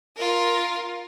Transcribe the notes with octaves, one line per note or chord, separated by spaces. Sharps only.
F4 A#4